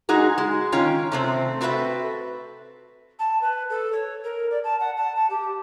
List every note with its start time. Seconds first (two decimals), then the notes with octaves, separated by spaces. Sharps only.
0.09 G#3 D#4 F#4 G#4
0.38 G#3
0.72 D#3 C#4 F4 C#5 G5
1.12 C3 A3 C4
1.61 C4 F#4 A4 B4 E5
3.19 A5
3.41 B4
3.70 A4
3.93 C#5
4.23 A#4
4.51 D5
4.64 A5
4.80 F#5
4.97 A5
5.16 A5
5.30 G4